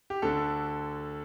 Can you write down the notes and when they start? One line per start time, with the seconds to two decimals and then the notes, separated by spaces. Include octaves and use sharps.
0.10 G4
0.22 D2 D3 A4